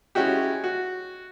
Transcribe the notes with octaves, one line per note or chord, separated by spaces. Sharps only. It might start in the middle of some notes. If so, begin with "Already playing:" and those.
G#3 C#4 E4 F#4 G4
F#4